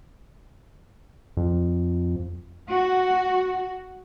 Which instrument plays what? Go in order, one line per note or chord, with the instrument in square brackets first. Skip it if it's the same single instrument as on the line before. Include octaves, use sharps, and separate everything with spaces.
[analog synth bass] F2
[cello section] F#4